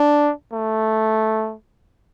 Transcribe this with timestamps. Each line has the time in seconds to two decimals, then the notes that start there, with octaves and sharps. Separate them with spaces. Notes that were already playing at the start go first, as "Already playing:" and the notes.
Already playing: D4
0.53 A3